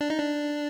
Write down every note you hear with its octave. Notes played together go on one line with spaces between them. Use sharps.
D4
D#4
D4